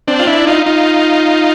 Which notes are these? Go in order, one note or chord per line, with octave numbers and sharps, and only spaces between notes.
C4 D4
F4
D4 E4
D#4 F4
D#4 F4